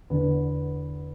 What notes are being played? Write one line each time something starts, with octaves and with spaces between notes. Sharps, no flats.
E2 D3 B3